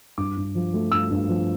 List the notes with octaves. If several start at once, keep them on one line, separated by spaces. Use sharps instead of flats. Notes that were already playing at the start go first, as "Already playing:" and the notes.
G2 D6
G2
F3
A3
G2 E6
G2
F3